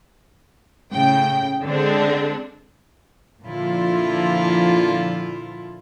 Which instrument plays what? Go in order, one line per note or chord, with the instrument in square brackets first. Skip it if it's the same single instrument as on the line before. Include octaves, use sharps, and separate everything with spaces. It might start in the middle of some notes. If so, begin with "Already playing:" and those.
[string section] A2 C#3 G5
D3 G#3 C4 D4
[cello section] A#2 D3 F3 E4 F4